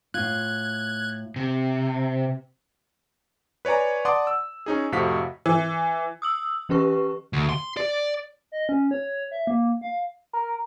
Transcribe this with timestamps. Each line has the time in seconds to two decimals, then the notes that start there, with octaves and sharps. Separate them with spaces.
0.14 A2 F4 F#6 G#6
1.36 C3
3.65 B4 C#5 D5 G#5 A#5
4.05 D5 F#5 A5 C6 D6 D#6
4.27 E6
4.66 C#4 D#4 G#4
4.92 F2 A2 C3 F#4 F5 B6
5.46 E3
6.22 D#6 E6 F#7
6.69 E3 C#4 G4 B4 C#6
7.33 D2
7.49 C6
7.77 D5
8.52 D#5
8.69 C#4
8.91 C#5
9.31 E5
9.47 A#3
9.81 F5
10.33 A#4